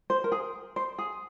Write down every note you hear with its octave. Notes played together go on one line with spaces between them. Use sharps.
C5
A#4
G#4
C5
G#4